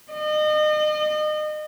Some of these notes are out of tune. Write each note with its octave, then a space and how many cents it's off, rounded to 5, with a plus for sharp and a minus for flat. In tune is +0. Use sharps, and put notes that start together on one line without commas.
D#5 -35